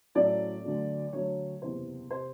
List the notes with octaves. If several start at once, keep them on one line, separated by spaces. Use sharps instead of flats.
A2 F#3 A3 C#4 D5
D2 D3 F#3 A3
D2 D3 F#3 A3 C#5
F#1 E2 C3 C5
C3 C5